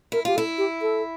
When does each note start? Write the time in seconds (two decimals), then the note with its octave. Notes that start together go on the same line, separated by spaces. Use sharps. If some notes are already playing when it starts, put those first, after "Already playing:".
0.12 E4 A#4
0.25 F4 G4
0.36 E4 A4
0.58 G4
0.82 A4